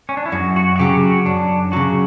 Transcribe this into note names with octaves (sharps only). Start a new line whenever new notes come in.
C#4
D4
E4
F#2 F#4
F#4
F#4
C#3 F#3 G4
F#4
F#2 D4
C#3 F#3 F#4